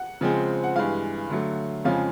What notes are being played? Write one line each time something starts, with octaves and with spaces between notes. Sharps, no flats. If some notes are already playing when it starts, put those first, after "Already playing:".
Already playing: F#5
C#3 F3 G#3 C4
F#5
G2 E3 G#3 F5
D3 F#3 A3
F2 C#3 F3 G#3 C#4 F5